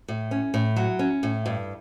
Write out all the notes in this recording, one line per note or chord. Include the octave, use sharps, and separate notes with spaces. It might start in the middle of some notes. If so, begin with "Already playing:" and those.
A2
C#4
A2
F#3
C#4
A2
G2